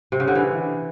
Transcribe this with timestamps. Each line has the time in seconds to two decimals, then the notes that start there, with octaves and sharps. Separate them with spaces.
0.12 C3
0.20 C#3
0.28 D3
0.35 E3